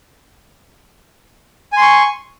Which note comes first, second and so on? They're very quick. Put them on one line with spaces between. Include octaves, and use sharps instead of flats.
G#5 C6 C#6